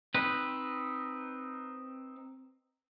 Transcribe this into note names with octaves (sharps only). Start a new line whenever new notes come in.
C4 D#4 B4